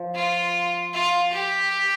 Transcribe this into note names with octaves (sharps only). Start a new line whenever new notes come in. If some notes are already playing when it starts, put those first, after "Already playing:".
Already playing: F3
F4
F4
G4